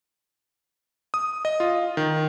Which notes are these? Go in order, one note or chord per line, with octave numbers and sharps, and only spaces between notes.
D#6
D#5
F4
D#3